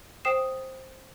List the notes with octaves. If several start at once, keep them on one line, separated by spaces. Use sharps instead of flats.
C5 G5 D#6 C7 E7